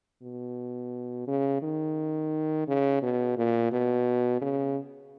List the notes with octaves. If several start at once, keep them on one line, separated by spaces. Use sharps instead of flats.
B2
C#3
D#3
C#3
B2
A#2
B2
C#3